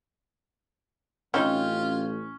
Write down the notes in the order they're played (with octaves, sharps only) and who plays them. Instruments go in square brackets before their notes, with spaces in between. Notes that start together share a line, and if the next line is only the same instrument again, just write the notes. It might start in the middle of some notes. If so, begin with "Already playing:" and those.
[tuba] A1 [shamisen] C4 D#4 [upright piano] C#4 G6 [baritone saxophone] F4